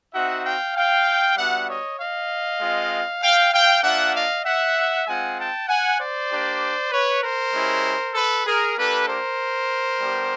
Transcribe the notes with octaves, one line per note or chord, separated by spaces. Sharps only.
C4 D#4 F#4 E5 F#5
F5 G5
F5 G5
G3 B3 D4 F#4 E5 F#5
C#5 D#5
D#5 F5
G#3 C4 F4
F5 G5
F5 G5
A#3 D4 F4 E5 F#5
D#5 F5
E5 F#5
G#3 C4 F4 F#5 G#5
G5 A5
F#5 G#5
C5 D5
A#3 D4 G4
B4 C#5
A#4 C5
G#3 C#4 E4 G4
A4 B4
G#4 A#4
A#3 D4 G4 A4 B4
A#4 C5
G3 B3 D4 G4